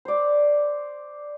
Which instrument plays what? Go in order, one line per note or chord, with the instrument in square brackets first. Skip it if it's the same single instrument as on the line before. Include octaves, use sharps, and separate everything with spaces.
[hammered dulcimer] C5 D5